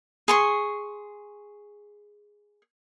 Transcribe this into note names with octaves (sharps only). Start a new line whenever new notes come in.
G#4 C6 C#6